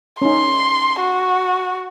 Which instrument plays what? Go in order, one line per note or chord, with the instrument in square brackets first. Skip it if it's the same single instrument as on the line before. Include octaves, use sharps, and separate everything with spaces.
[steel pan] C#4 D#4 [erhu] C6
[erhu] F#4